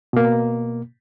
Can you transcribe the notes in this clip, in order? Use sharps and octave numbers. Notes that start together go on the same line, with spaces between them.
B2 A#3